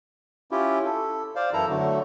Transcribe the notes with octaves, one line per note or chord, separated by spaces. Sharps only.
C#4 E4 F4 G4
A4
C5 D5 F5
F#2 E3 E4 A4 A#5
D3 F#3 A3